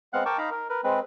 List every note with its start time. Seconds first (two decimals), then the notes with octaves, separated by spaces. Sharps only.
0.13 G#3 B3 C4 F5 F#5 F#6
0.26 A#4 G5 A5 C#6 D6
0.38 D#4 F5 A#5 B5
0.51 A#4
0.69 A#4 B4
0.84 G#3 C4 B4